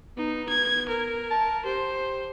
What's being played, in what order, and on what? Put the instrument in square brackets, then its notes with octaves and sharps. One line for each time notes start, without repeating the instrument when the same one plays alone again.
[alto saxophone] B3 [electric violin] D#4
[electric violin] G#6
A#4
[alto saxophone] A5
[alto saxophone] G4 [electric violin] C5